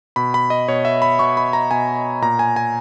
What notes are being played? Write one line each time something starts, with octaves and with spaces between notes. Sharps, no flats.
B2 B5
B5
D#5
B2 C#5
E5
B5
B2 C#6
B5
A#5
B2 G#5
A#2 A#5
G#5
G#5